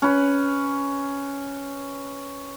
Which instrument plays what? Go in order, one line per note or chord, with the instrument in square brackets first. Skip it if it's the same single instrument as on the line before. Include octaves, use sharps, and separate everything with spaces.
[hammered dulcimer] C#4 B4